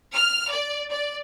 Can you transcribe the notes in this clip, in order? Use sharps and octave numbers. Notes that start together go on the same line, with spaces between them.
F6
D5
D5